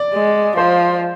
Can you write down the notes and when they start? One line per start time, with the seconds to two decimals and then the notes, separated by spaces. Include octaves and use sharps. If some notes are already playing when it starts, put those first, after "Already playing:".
Already playing: D5
0.14 G#3
0.57 F3 C5